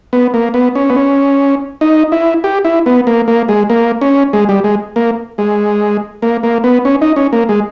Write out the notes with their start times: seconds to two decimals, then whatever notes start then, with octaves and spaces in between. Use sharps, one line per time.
0.13 B3
0.34 A#3
0.54 B3
0.75 C#4
0.90 B3
0.96 C#4
1.81 D#4
2.12 E4
2.44 G4
2.65 E4
2.86 B3
3.07 A#3
3.28 A#3
3.49 G#3
3.70 A#3
4.01 C#4
4.33 G#3
4.49 G3
4.64 G#3
4.96 A#3
5.38 G#3
6.22 A#3
6.43 A#3
6.64 B3
6.85 C#4
7.02 D#4
7.16 C#4
7.33 A#3
7.49 G#3